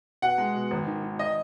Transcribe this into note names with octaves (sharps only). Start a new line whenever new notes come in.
B2 F#5
G#3
B2
G#1
D#3
D#3
D#5